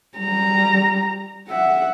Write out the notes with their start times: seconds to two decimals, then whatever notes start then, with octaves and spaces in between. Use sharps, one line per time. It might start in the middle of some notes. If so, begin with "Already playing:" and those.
0.18 G3 A#5
1.49 E5 F#5